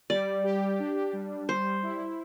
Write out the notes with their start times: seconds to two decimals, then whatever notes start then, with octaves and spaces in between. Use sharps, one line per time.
0.10 G3 D5
0.44 G4
0.79 D4
1.13 G3
1.49 G3 C5
1.83 E4